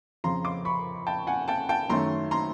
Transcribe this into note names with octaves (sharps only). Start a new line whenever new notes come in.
F2 C#3 F3 A#5 C6
C6 D6
B5 C#6
G5 A5
F#5 G#5
G5 A5
G5 A5
F#2 D#3 F#3 A3 A#5 C6
A#5 C6